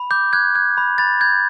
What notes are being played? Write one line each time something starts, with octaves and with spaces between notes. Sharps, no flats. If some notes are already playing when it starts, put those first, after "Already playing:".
Already playing: B5
D6 G6
F#6 G#6
F#6 G#6
B5
B5 A6
G6 G#6